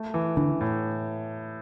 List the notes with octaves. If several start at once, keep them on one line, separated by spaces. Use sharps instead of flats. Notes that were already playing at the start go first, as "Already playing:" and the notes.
Already playing: A3
E3
D3 E3 D4
A2